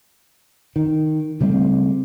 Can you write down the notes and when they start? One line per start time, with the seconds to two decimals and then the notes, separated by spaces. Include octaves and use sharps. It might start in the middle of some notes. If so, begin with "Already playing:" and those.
0.76 D#3
1.40 C#3 G3 A3 C4